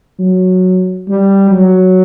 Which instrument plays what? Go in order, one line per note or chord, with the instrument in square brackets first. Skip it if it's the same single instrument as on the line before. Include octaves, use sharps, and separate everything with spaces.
[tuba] F#3
G3
F#3